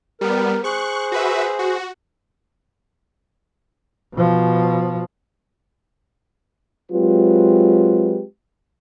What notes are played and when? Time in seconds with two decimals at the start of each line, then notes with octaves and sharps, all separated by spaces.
0.21 G3 B3 A#4
0.64 G#4 C5 C#6 F#6
1.12 F#4 B4 E5
1.59 F#4
4.14 B2 F3
6.92 F#3 G#3 C4 F4 G4 B4